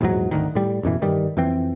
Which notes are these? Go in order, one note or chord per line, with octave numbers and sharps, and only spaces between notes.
A#1 E2 G#2 F#3
G#1 D2 D#3
A2 G3
A1 F#2 B2 E3
G2 D#3 G3
F2 E3 C4